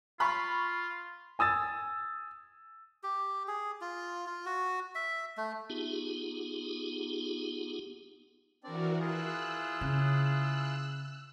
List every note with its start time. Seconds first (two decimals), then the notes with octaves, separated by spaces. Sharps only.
0.20 F4 B5 C#6
1.39 G#5 D#6 E6 A6
3.03 G4
3.48 G#4
3.81 F4
4.26 F4
4.46 F#4
4.95 E5
5.37 A3
5.70 B3 D#4 F4 G4 G#4
8.64 E3 C4 D4 F#4 A#4 D5
9.00 E4 F4 G#4 E6 F#6
9.81 C#3